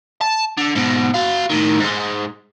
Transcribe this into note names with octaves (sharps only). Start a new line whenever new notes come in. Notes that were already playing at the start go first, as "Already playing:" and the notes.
A5
D3
G#2 B2
F#4 F5
A2 D#3
G#2 G#3